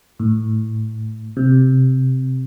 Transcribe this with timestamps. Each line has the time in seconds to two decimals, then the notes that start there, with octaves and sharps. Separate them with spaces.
0.19 A2
1.37 C3